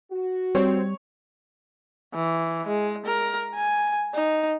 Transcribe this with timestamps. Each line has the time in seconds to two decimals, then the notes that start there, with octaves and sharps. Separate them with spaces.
0.11 F#4
0.55 G3 C4 C#5
2.14 E3
2.67 G#3
3.06 A#4
3.55 G#5
4.15 D#4